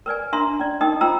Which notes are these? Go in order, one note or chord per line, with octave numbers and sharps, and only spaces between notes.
A#4 B4 D5 G#5
D4 A#4 E5 A#5 C6
C#4 D5
D#4 A#4 D#5 G5 D#6
F4 C5 G5 A#5 E6